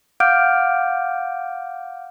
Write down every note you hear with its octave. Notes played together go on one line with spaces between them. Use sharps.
F5 F#5 D6 F6 G6 D7